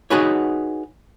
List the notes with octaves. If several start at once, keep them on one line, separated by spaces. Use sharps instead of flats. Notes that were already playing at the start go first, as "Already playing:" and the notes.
D#4 F#4 G#4 B4 C#5